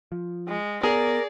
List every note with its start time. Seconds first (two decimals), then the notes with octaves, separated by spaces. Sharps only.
0.12 F3
0.48 G#3
0.83 B3 G#4 A#4 D5